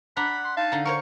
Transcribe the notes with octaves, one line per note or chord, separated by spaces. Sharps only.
D4 F#5 A#5 B5
C6
D#4 F5 A5
D3 A#5
A#4 C5 C#5 C#6